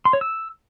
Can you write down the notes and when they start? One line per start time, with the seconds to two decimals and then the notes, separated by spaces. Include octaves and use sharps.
0.05 C6
0.13 C#5
0.21 E6